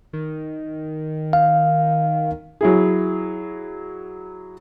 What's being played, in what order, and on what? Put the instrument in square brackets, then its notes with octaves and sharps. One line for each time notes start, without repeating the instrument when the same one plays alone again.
[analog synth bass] D#3
[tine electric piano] F5
[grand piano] F#3 E4 G#4